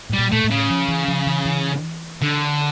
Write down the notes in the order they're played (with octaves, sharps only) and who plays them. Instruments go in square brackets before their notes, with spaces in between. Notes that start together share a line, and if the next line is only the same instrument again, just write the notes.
[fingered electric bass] A2 [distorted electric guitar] G3
[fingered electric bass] A#2
[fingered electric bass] A#2 [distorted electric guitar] A3
[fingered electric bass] A2
[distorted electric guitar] C#3
[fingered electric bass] F3
E3
F3
E3
E3
[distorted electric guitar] D3